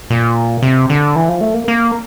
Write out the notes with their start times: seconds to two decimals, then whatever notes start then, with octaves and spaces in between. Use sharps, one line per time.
0.10 A#2
0.63 C3
0.90 D3
1.16 E3
1.29 F3
1.41 A3
1.54 A#3
1.68 A#3